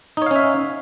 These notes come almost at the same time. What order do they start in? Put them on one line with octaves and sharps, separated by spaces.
D#4 C#5 F5 C#4 E5